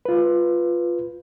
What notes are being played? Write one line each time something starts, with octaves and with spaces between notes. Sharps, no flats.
F4 B4